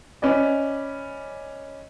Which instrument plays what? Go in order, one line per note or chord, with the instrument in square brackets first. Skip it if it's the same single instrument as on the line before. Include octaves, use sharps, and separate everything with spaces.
[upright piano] C#4 B4 D5 D#5